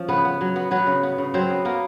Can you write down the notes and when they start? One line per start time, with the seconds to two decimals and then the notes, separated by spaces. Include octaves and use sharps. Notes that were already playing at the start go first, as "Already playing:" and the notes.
Already playing: F3 C#4
0.08 C#3 B3 B4
0.25 B3
0.41 F#3
0.56 B3
0.71 F#3 B3 B4
0.87 C#3
1.03 B3
1.18 C#3
1.34 F#3 C4 C5
1.50 B3
1.65 A#3 B3 A#4